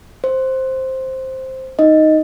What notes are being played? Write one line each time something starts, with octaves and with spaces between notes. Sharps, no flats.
C5
D#4 D#5